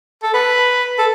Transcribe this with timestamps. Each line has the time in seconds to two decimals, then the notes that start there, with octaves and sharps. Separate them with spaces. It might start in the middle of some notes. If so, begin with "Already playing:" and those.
0.23 A4
0.34 B4
0.99 A4